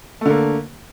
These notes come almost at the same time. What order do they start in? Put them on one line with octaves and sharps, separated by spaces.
A3 D3 A#3